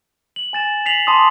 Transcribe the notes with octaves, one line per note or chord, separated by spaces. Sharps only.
F#7
G#5 A6 E7
B6 C7 F7 F#7
A5 C6 D6 D#6